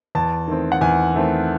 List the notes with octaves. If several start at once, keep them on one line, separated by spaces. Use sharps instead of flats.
E2 A5
D#3 A3 C4
F#5
E2 G#5
D#3 A3 C4